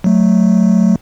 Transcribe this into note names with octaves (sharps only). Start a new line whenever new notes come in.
F#3 A3